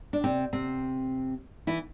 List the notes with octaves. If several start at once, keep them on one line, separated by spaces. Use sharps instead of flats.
D4
C3 C4
C3 C4
E3 E4